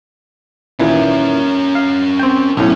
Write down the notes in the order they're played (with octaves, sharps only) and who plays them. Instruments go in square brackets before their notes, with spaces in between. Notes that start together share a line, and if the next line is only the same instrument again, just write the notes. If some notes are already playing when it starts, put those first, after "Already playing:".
[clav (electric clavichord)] D#2 A#2 E3 [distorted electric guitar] C#4 A#4
[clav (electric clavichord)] F5
C4 G5
[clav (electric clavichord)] B1 A2 [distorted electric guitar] C#4